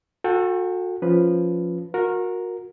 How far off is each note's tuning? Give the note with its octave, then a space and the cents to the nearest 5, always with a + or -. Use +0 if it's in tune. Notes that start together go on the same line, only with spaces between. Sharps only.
F#4 -35 A4 +15 G5 +15
F3 +0 C#4 +0 B4 +0
F#4 -30 A#4 +0